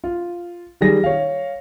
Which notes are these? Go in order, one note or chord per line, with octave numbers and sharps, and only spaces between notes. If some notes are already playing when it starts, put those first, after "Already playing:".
F4
D#3 G3 G#4 A#6
C#5 F5